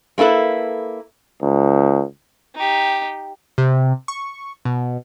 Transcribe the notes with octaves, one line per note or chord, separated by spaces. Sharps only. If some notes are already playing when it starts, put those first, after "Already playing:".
G#3 A#3 E4 A4 B4
C#2
D#4 G4
C3
C#6
B2